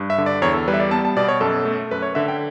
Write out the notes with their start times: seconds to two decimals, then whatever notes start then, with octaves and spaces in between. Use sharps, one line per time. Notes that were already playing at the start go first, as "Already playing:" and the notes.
Already playing: G2
0.10 E5
0.18 D3
0.26 D5
0.42 E2 C#5
0.54 A4
0.68 G3 B4
0.74 E5
0.80 D5
0.91 B3 A5
1.05 A5
1.16 B2 D5
1.28 C#5
1.41 F#2 A4
1.65 A3
1.91 F#2 B4
2.02 C#5
2.15 D3 E5
2.28 G5